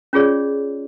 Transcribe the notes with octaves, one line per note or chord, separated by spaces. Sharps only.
C#4 F4 G#4 C#5 D5